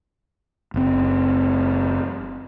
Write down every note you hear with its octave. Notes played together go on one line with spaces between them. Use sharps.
F#1 C4